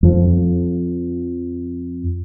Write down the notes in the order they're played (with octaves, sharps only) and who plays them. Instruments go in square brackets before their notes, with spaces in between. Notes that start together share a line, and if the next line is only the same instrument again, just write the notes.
[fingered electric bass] F2 F3